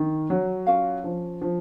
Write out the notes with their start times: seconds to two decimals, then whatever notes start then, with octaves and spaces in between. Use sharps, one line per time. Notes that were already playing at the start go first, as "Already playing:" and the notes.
Already playing: D#3
0.30 F#3
0.66 C#4 F4 A#4 F5
1.04 F3
1.42 F3